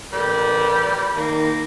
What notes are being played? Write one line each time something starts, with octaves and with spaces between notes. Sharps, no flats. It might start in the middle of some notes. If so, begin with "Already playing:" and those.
A1 G3 A#4
D#3 A#3